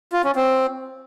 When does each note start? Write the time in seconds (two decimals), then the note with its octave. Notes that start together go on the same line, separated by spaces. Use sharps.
0.12 F4
0.24 C#4
0.36 C4